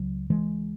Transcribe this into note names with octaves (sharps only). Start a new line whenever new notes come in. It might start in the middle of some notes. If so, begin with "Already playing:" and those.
Already playing: C#2 C#3 F#3
E3 G#3